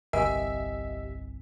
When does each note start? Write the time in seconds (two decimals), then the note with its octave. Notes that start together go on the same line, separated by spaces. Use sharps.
0.13 G1 C2 G4 A#4 D#5 E5 G#5